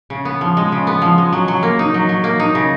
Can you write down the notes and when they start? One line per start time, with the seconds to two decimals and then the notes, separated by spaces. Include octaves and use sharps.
0.10 C#3
0.25 B3
0.41 F3
0.57 G#3
0.72 C#3
0.87 B3
1.02 F3
1.18 G#3
1.33 F#3
1.48 F#3
1.63 A#3
1.79 D#4
1.94 F#3
2.09 F#3
2.24 A#3
2.39 D#4
2.55 C#3